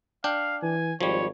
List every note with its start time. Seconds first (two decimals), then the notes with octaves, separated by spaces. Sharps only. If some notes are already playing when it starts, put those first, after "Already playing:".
0.24 D4 F5 G5
0.62 E3 G#5
1.01 G#1 F3 G3 C#5